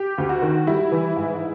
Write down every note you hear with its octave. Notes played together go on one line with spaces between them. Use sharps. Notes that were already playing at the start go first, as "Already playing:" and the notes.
Already playing: G4
D2
F#4
D#3
G3 E4
E3
G#2